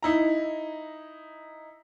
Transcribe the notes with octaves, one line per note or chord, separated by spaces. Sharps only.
D#4 E4 A#5